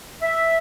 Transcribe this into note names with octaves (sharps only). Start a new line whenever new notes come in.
E5